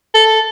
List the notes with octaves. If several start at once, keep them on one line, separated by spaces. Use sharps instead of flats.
A4